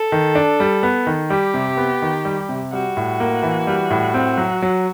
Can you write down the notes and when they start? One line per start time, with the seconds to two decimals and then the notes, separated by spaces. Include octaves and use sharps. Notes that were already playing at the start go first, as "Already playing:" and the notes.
Already playing: A4
0.12 D#3
0.35 D4
0.60 G3
0.83 B3
1.07 D#3
1.30 G3 G4
1.54 C3
1.77 B3
2.02 D#3
2.25 G3
2.49 C3
2.72 G3 F#4
2.97 A2
3.20 A#3
3.43 E3
3.67 G3
3.90 A2
4.14 C4
4.38 F#3
4.62 F#3